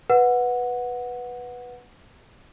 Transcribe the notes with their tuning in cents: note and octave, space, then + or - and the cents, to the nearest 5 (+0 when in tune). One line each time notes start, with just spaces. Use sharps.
B4 +0 F#5 -15